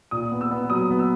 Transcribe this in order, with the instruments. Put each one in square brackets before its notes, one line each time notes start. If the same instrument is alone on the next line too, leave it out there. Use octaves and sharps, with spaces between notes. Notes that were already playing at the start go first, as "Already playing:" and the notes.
[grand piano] A#2 D#6
B3
E6
B3
F#3 D#6
B3
E6